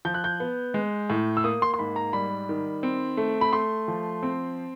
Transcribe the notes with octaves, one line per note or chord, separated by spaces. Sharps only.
F3 G6
F#6
G6
B3
G#3
A2
E6
A#3 D#6
C6
C6
G#2 B5
A#5
G3 B5
D#3
C4
A3
B5
A3 C6
F3
C4